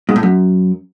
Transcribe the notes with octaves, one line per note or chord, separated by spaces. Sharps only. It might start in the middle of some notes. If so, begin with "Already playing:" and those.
G#2
A2
F#2